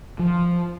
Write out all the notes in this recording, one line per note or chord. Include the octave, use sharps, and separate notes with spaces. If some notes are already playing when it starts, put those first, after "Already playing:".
F3